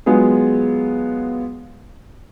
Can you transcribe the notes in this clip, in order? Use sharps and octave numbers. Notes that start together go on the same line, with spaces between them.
F#3 G#3 B3 F4 G#4